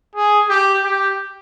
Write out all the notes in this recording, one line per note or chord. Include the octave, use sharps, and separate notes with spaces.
G#4
G4
G4